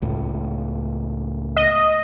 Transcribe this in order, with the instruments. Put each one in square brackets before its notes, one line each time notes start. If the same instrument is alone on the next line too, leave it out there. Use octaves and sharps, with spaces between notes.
[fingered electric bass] C#2 A2
[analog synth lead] D#5